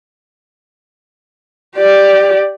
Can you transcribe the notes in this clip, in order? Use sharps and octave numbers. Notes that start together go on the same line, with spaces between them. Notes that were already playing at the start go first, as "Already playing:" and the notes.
G4 D5